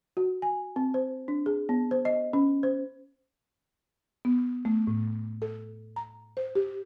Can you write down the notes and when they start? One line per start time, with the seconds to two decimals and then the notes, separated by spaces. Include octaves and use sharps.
0.17 F#4
0.42 G#5
0.76 C4
0.94 C5
1.28 D4
1.46 G#4
1.69 B3
1.91 C5
2.05 D#5
2.33 C#4
2.63 C5
4.25 B3
4.65 A3
4.87 A2
5.42 A4
5.96 A#5
6.37 C5
6.55 G4